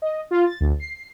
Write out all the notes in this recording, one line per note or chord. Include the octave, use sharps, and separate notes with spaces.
D#5
F4
A6
D2
C7